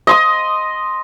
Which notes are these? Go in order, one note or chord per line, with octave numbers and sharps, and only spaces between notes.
D#5 C6 D#6